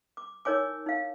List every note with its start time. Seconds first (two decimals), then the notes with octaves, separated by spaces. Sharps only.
0.17 D6
0.45 D#4 A#4 C#5 G#5 D6
0.86 D#4 F5